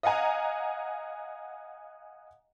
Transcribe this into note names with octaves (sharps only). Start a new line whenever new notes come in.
D#5 F5 F#5 G#5 A#5